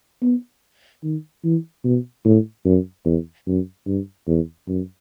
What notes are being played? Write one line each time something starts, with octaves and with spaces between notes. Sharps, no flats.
B3
D#3
E3
B2
A2
F#2
E2
F#2
G2
E2
F#2